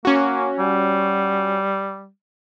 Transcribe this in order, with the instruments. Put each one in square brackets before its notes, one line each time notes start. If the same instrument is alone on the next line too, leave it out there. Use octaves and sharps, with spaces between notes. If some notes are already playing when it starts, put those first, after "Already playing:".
[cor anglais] A#3 [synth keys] C#4 F#4
[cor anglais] G3